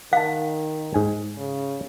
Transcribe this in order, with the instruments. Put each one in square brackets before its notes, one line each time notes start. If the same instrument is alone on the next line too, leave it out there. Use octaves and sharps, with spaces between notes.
[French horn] D#3 [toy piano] F5 [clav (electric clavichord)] F#5 A5
[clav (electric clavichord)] G#2 G#5
[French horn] C#3